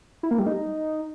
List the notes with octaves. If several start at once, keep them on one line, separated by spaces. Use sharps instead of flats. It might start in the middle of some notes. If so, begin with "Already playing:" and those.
E4
A#3
G3
D#4